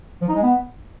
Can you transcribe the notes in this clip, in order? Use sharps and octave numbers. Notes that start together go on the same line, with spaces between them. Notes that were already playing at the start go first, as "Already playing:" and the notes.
F3
D#4
G#3
B3